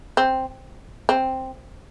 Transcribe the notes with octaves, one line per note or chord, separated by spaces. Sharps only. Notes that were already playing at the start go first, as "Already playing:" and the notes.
C4
C4